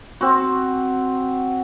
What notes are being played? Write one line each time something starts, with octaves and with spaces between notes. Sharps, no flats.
C4 F#4